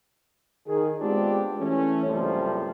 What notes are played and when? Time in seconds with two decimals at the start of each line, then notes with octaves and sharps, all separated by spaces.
0.66 D#3 G#4
1.00 G#3 B3 C4 D4 F4 G4
1.58 E3 A3 C#4
2.05 F#1 C#2 C3 F3 G3 A3